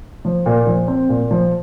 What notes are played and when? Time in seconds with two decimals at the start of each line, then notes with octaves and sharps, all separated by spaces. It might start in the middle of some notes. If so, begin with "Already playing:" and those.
0.25 F3
0.46 A#2
0.67 F3
0.88 C4
1.09 A#2
1.31 F3